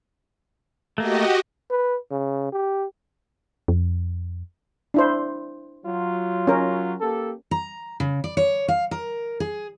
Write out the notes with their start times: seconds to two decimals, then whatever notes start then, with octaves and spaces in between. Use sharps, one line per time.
0.98 A3 A#3 F#4 G4 D#5
1.71 B4
2.11 C#3
2.53 G4
3.68 F2
4.94 D4 E4 C5
5.85 F#3 F4
6.47 C#4 A#4
7.01 A#3 G4 A4
7.51 A#5
8.00 C#3
8.24 D5
8.37 C#5
8.68 F5
8.91 A#4
9.40 G#4